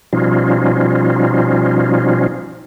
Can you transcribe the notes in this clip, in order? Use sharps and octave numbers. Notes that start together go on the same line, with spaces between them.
B2 F3 G3 C#4 D#4 F4